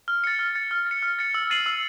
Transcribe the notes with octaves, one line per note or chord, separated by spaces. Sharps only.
F6
A6 C#7
F6
A6 C#7
F6
A6 C#7
F6
A6 C#7
E6
A6 C7 D#7 F#7
E6